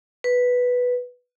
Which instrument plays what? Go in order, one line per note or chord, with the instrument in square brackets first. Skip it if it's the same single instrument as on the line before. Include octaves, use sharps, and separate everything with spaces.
[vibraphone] B4